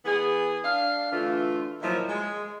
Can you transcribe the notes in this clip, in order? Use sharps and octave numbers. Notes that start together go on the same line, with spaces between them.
E3 B3 G#4
D4 F5
D3 E3 A3 F4
A#2 D#3 F3 F#3 E4
G#3